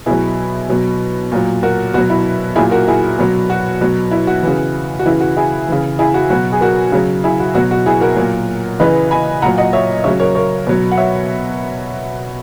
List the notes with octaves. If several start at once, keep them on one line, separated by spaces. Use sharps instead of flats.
B2 F#3 E4 G#4
B2 F#3
A#2 F#3
F#4 A#4
B2 F#3 F#4
E4
A#2 F#3 E4 G#4
F#4 A#4
E4 G#4
B2 F#3
F#4
B2 F#3
E4
F#4
C#3 E3
F#4
C#3 E3 E4
F#4
E4 G#4
C#3 E3
E4 G#4
F#4
B2 F#3 F#4
G#4
F#4 A#4
C#3 F#3
E4 G#4
F#4
B2 F#3 F#4
F#4
E4 G#4
F#4 A#4
A#2 F#3
C#3 E3 B4 D#5
G#5 B5
A#2 F#3 F#5 A#5
D#5 F#5
C#5 E5
C#3 F#3 C#5 E5
A#4 C#5
A#4 C#5
B2 F#3
F#5
C#5 E5